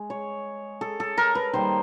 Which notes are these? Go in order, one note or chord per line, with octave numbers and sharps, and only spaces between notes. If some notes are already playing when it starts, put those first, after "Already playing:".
Already playing: G#3
C#5
A4
A4
A#4
B4
D#3 G3 A#3 C5